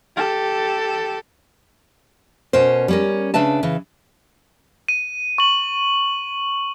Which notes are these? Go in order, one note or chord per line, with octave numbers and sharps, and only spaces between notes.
G4 A4
B2 C#4 A#4 C5
G3 C#4 A#4
C#3 D4 B4 E5 A5
C#3 E3
D#7
C#6 F#7